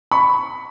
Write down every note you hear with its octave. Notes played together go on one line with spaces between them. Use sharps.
B5 C#6